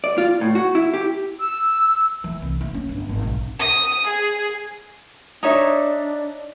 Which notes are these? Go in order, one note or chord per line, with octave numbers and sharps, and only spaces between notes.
D5
F4
A2
F#4
E4
G4
E6
E3
C2
E4
C#4
G1
G#1
B1
D#6
G#4
D4 D#4 C#5 E5